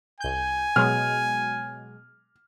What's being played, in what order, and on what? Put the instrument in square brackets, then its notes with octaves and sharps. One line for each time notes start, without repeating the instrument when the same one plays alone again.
[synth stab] C2 G6 [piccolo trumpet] G#5
[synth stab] B2 F#3 G#3 [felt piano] F6